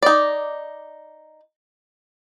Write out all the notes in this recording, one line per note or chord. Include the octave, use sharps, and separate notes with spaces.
D#4 D5